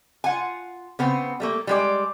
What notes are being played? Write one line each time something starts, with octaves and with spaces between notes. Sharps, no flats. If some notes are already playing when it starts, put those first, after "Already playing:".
F4 F#5 G#5
C#3 B3 C4
G3 A3 A#3
G3 G#3 D5